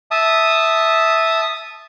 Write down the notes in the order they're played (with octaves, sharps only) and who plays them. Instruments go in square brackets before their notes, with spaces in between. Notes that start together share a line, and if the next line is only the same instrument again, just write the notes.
[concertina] E5 A5 D#6